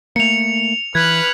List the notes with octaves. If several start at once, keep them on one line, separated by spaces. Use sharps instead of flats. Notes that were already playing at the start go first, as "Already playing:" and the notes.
A3 A#3 C#7 F7
E3 B4 F6 F#6 G#6